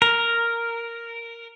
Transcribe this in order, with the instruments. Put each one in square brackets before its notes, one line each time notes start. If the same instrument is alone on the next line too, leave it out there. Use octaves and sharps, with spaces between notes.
[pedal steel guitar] A#4